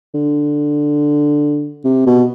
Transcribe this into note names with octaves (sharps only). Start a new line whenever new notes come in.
D3
C3
B2